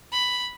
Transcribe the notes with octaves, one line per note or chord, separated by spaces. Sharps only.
B5